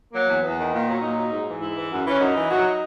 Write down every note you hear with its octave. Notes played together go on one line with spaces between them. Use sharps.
F#3 A#3
E2
E2 B3
D#3
A#2
F#3
A#2 D#4
F#3
G#2
E3
G#2 E4
E3
F#2
E3 C#4
F#2 D#4
E3
F#3